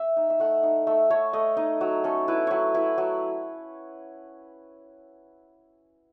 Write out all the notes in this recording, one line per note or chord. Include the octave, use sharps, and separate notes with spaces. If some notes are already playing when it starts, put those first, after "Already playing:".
Already playing: E5
D#4
E5
A3 F#5
D#4
A3 E5
A3 C#5
A3 D#5
D#4 D#5
F#3
C#4 A4
E4 B4
F#3 B4 C#5
E4 B4
F#3